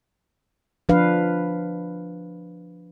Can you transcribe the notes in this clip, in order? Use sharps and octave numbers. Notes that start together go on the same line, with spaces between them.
F3 D4 B4 F5